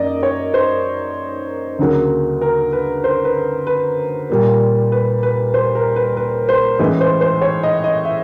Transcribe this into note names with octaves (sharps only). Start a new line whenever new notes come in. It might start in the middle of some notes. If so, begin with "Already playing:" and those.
Already playing: F#2 D#3 A#3 D#4 D5 D#5
C#5
C5
D2 C#3 F#3 A#3
A#4
B4
C5
B4
B4
A#2 G3 A#3
B4
B4
C5
A#4
B4
B4
C5
A2 E3 G#3 C#4 B4
C5
C5
C#5
D#5
D#5
E5